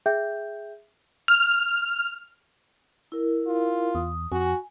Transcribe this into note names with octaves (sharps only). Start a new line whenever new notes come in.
G#4 E5 G5 G6
F6
E4 A#4
F4
E2 D#6
F2 F#4 G#5